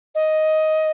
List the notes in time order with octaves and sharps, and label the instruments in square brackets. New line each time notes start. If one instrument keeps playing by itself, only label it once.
[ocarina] D#5